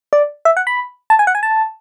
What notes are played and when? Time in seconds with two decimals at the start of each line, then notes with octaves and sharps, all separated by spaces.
0.13 D5
0.45 E5
0.57 F#5
0.67 B5
1.10 A5
1.19 G#5
1.27 F#5
1.35 G#5
1.43 A5